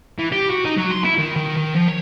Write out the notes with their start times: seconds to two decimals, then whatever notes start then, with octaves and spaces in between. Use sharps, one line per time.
0.18 E3
0.32 G4
0.50 F#4
0.65 D#4
0.78 F#3
0.92 C6
1.05 E4
1.18 D#3
1.36 D#3
1.57 D#3
1.75 F3
1.88 C#5